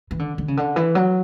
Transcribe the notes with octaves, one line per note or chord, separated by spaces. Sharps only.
E3
D3
D3
C#3
D3
E3
F#3